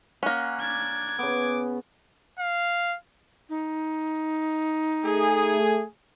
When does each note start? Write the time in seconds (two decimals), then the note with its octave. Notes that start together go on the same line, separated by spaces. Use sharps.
0.23 A#3 C#4 F#5
0.60 D4 G#6
1.19 C#3 B3 D6
2.39 F5
3.50 D#4
5.06 A3 G#4